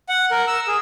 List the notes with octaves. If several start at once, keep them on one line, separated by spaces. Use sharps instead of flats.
F#5
A#4
E6
G#4